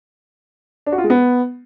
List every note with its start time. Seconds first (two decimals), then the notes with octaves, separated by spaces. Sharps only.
0.86 D4
0.92 F#4
0.98 F4
1.04 G#3
1.10 B3